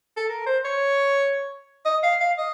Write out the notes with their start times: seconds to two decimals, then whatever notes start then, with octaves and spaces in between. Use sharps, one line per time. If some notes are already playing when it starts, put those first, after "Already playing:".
0.17 A4
0.29 A#4
0.46 C5
0.65 C#5
1.85 D#5
2.03 F5
2.21 F5
2.38 D#5